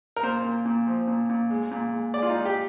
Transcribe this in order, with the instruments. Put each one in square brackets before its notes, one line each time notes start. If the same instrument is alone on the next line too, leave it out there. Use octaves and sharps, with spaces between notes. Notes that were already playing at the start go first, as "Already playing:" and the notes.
[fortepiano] A#4
A#2 C5
A#2
A#2
F3
A#2
A#2
G#3
A#2
G#3
G#3 D5
F4
D#4
G#3
G4